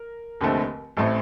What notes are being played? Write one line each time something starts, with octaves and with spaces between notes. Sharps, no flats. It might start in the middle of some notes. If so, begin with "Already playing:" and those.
Already playing: A#4
F1 D#2 D3 A3 C4
A1 A2 A3 C4 A4